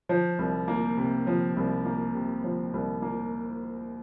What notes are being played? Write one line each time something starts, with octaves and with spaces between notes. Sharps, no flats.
F3
C2
A#3
C3
F3
C2
A#3
C3
F3
C2
A#3